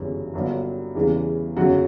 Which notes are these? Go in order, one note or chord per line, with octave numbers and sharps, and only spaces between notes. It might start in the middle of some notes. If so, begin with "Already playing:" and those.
Already playing: G1 F#2 C#3 E3 G3
G1 G2 F#3
E2 C#3 E3 G3
G1 F#2 C#3 F#3 F#4